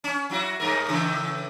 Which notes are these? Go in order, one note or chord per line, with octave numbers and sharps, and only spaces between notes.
C#4
F#3 E4 F#4
G2 A#4
A2 C#3 E3